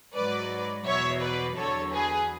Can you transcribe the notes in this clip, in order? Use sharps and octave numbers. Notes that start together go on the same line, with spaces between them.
G#2 F#3 B4 D5
E2 B2 F#3 C#5 E5
B4 D5
E2 D3 F#3 A4 C#5
G#4 B4